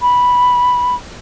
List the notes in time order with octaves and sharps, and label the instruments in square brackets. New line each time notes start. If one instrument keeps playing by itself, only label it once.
[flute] B5